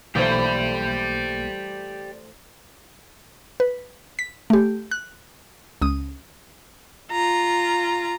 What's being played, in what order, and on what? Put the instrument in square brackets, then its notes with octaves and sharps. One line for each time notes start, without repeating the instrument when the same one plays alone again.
[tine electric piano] B1 A#3 D6 [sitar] E3 A3 C5 [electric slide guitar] G4 D5
[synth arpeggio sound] B4
B6
A3 G4
F#6
C#2 D#6
[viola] F4 A#5